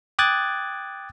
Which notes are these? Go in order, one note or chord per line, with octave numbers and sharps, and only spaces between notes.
G5 D6 D#6 F#6 G#6 A6